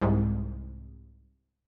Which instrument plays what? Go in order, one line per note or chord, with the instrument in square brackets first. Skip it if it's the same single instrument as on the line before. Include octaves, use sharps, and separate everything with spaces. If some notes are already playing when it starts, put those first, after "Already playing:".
[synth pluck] C2 G#2